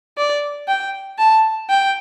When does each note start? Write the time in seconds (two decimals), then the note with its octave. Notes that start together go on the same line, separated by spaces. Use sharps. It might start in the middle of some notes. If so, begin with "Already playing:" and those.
0.18 D5
0.68 G5
1.19 A5
1.70 G5